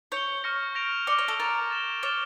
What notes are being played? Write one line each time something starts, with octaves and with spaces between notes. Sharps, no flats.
C#5 G6 C#7 G7
C#6 F6 A#6 C#7
G6 A#6 D7 F7
D5 F6 C#7 G7
C#5
A4
A#4 D6 A6 D7
A6 E7 G7
C#5 D6 F6 A6 E7 G7